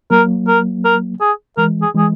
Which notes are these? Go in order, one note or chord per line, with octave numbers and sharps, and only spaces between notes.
F#3 A#3 A#4
A#4
A#4
G#4
E3 G#3 A#4
G#4
E3 G#3 G#4